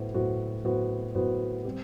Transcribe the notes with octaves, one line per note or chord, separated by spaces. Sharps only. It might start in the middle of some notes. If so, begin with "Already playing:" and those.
Already playing: A2 F#3 B3 F#4 C5
A2 F#3 B3 F#4 C5
A2 F#3 B3 F#4 C5
A2 F#3 B3 F#4 C5
G3 C4 G4